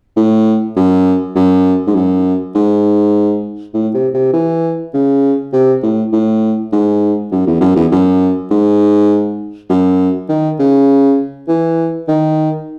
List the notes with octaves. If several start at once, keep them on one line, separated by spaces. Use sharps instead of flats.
A2
F#2
F#2
G#2
F#2
G#2
A2
C3
C3
E3
C#3
C3
A2
A2
G#2
F#2
E2
F#2
E2
F#2
G#2
F#2
D#3
C#3
E3
D#3